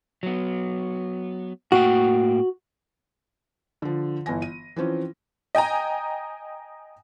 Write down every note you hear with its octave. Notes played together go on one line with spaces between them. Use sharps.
F#3 B3
A2 A#3 F#4 G5
D3 F3
G1 E3 G#5 A#6
D#7
E3 F3 C4 C#4
D#5 G5 G#5 A#5